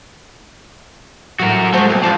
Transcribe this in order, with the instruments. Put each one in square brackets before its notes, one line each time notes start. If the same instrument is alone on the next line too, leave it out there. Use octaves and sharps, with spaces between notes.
[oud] A2 E3 F#3 [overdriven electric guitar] F#4 A#4
[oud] G#3 C5 [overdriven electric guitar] A3 F#4
[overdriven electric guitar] B1 [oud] A#3 C4
[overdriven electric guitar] G2 F3 [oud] D4 D#4 F#4